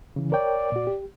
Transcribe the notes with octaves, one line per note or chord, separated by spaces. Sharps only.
C#3 E3
A#4 C#5 D5 G5
A#2 F#4
G4